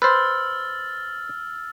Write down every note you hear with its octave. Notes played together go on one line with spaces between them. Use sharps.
B4 C5 E6 F6 A6